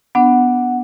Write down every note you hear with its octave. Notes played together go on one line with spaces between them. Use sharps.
B3 D4 F#5